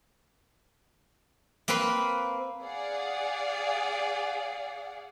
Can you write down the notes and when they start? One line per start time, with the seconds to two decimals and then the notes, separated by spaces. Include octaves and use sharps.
1.68 A#3 C4 B4 B5 C6
2.64 G#4 D5 F5 F#5